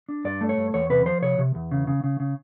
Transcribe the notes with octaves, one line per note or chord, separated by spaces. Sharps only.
D4
G2 D5
A3
C#5
G2
E2 C#5
C3 B4
F3 C5
C3 C#5
C3
E2
C#3
C#3
C#3
C#3